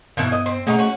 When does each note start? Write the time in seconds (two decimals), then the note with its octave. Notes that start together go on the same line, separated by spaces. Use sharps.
0.17 G2 B2 D#3 E3 B3
0.32 D#5
0.46 C4
0.67 B2 A3 C#4 D#4 G#4 F#5
0.78 C#4 F#4